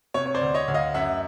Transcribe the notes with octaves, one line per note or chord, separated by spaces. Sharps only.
C3 C#5
C#5
C5 D5
D2
C#5 D#5
D2
D#5 F5
F#2 E5 F#5